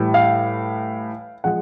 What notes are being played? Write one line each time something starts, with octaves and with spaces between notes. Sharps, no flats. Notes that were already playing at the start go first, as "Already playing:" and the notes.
Already playing: A2 E3 G3
F5
F3 G#3 F#5